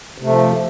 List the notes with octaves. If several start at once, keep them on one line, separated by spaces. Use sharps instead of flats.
C3 F3 A3